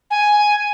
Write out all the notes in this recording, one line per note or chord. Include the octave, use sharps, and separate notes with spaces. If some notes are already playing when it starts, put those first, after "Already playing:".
G#5